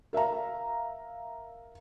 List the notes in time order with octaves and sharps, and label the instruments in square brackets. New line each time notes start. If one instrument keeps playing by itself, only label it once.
[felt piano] A#4 E5 F5 A#5